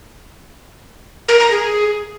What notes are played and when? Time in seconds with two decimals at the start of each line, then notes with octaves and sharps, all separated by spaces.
1.29 A#4
1.40 A#5
1.51 G#4